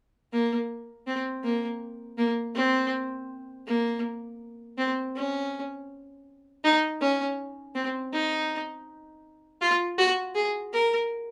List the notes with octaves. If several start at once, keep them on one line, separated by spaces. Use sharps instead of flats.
A#3
C4
A#3
A#3
C4
A#3
C4
C#4
D#4
C#4
C4
D#4
F4
F#4
G#4
A#4